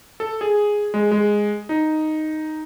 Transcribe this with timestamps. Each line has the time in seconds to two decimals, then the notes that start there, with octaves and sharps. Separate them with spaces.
0.20 A4
0.41 G#4
0.94 G#3
1.11 G#3
1.69 D#4